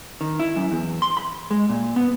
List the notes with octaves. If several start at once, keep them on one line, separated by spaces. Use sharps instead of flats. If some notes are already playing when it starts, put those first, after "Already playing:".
D#3
E4
F#2
E2
C6
B5
G#3
A#2
B3